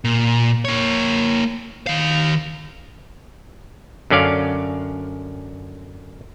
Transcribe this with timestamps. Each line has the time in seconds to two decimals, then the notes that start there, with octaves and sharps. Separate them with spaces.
0.04 A#2
0.65 A#3 C#5
1.87 D#3 F5
4.10 F#2 D3 C#4 D5 F5